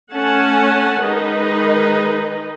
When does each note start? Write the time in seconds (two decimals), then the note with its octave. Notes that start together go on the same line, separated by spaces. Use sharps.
0.13 A3 C#4 F#5 G#5 A5
1.02 D#3 G#3 D#4 B4 D#5